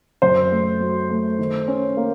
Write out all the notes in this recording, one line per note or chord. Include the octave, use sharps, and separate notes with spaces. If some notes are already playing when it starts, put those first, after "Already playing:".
F#2 C5
A3
F#3
A3
D#3
C#4
A#3